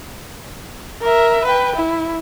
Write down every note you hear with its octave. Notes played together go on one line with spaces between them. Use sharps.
A#4 E5
B4 G5
E4